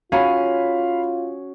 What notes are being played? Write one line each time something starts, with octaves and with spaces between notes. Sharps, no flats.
C#4 F4 F#4 G#4 F5 B5